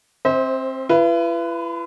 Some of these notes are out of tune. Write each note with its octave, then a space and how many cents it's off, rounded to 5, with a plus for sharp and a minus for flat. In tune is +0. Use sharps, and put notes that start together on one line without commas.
C4 +25 C5 +0 E5 -40
E4 +45 B4 +0